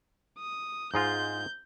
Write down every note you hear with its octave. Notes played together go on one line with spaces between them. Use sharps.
D#6
G#2 G#3 F4 G6